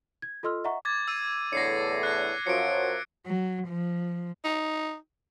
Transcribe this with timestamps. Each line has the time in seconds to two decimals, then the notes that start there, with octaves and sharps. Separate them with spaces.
0.22 G#6
0.43 F4 A4 D#5 C6 E6 F6
0.64 D#5 E5 F#5 A#5 C#6
0.85 D6 G#6 A6
1.08 E6 D#7
1.53 E2 A2 D3 A#6 C7 C#7
2.03 F#6 G#6 C7
2.47 F#2 F3 F#3 C#7 D7
3.24 F#3
3.67 F3
4.45 D#4